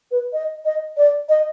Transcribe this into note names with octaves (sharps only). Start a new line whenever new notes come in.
B4
D#5
D#5
D5
D#5